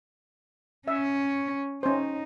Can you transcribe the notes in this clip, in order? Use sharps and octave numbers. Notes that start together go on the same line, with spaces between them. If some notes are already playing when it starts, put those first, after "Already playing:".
C#4 C#5 E5
C#4 D#4 C5